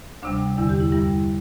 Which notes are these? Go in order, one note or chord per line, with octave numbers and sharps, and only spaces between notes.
D2 C3 G3 D4
E2 D3 G3 E4
G4
E4
G2 G3 E4